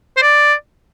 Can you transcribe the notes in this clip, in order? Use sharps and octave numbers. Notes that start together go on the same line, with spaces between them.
C5
D5